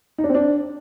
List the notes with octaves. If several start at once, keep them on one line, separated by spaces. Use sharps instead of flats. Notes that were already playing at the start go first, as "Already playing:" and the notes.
D#4
D4
C4
D4